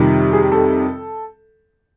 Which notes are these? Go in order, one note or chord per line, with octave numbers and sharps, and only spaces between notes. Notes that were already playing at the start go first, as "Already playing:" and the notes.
Already playing: F2 C3 D#3 G3
G#4
A4